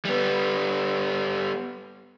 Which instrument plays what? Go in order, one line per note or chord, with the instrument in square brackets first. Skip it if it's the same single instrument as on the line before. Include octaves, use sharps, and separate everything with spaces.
[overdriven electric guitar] G3 B3